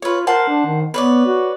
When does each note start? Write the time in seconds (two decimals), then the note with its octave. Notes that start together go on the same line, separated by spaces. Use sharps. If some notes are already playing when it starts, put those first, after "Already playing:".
0.02 F4 B4 C#5
0.27 A#4 C5 F#5 A5
0.48 D4
0.66 D#3
0.94 B3 B4 C#5 D5
1.26 F#4